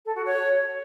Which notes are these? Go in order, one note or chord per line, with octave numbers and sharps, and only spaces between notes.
A4
F#4
C#5